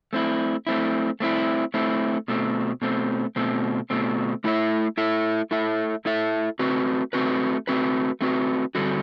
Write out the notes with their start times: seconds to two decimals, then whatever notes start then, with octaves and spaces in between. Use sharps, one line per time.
0.13 A3 C4 E4
0.67 A3 C4 E4
1.20 A3 C4 E4
1.74 A3 C4 E4
2.28 B2 A3 C4
2.82 B2 A3 C4
3.36 B2 A3 C4
3.90 B2 A3 C4
4.44 A3 E4 A4 E5
4.98 A3 E4 A4 E5
5.51 A3 E4 A4 E5
6.05 A3 E4 A4 E5
6.59 A3 C4 F#4 B4
7.13 A3 C4 F#4 B4
7.67 A3 C4 F#4 B4
8.21 A3 C4 F#4 B4
8.75 D3 G3 C4 F#4 A4